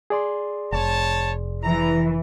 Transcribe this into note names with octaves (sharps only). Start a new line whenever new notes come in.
G#4 D5 C6
F1 C#5 A5
E3 A#5